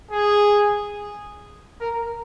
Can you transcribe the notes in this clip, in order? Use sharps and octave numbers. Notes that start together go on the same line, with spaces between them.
G#4
A#4